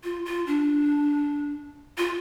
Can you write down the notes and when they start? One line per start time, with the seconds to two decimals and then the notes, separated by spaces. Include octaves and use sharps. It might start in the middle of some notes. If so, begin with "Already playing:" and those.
0.04 F4
0.25 F4
0.47 D4
1.98 F4